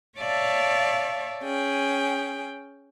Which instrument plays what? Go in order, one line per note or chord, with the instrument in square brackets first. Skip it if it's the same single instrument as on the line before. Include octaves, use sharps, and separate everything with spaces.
[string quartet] C#5 D5 E5 F5 A5
C#4 G#4 G5